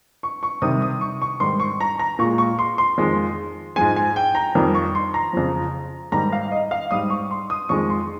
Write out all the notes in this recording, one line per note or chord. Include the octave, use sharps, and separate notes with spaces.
C#6
C#6
C3 D#3 G3 D#6
D#6
C#6
C#6
G#2 D#3 G3 C6
C#6
A#5
A#5
A#2 G#3 C#6
C#6
C6
C6
F2 D#3 G#3
G#2 F3 G#3 G#5
G#5
G5
A#5
F2 D#3 G3 A#5
C#6
C6
A#5
F2 C#3 F3
G#2 D#3 G3 A#5
F5
D#5
F5
G#2 G3 D#6
C#6
C6
D#6
F2 D#3 G#3 C#6
C6